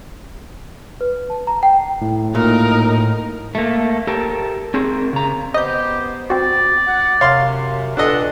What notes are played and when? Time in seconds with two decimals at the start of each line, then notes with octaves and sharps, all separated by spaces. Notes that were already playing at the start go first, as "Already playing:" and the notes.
1.01 B4
1.30 A5
1.47 A#5
1.63 G5
2.01 A2
2.35 A#2 D#4 A#4
3.55 A3 A#3
4.07 G4 A4 A#4
4.74 C4 G#4 A#4
5.13 C#3 A#5
5.54 B3 G4 C5 D#5 G6
6.30 C4 F#4 D5
6.87 F#5
7.21 F#2 C3 C#5 F5 C6
7.97 G2 A#2 D4 A4 D#5 F#5